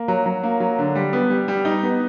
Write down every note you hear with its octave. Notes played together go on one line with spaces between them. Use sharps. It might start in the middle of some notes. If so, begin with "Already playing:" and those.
Already playing: A#3
F#3
F#3
A#3
F#3
D3
G3
B3
G3
G3
D#4
B3